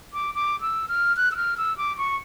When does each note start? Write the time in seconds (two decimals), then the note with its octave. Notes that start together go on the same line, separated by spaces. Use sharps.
0.13 D6
0.35 D6
0.61 E6
0.89 F6
1.17 F#6
1.32 E6
1.36 F6
1.58 E6
1.78 D6
1.98 C#6